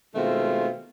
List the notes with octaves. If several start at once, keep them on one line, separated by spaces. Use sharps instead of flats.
B2 D#3 G#3 A3 C4 F4